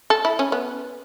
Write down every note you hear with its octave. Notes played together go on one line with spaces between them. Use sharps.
A4
E4
C#4
B3